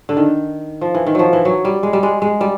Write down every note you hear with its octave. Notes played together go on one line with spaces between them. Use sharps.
D3
D#3
F3
E3
D#3
F3 F#3
E3
F#3
G3
G#3
G3
G#3
G#3
G3